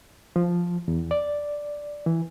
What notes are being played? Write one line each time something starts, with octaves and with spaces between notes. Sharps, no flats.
F3
E2
D5
E3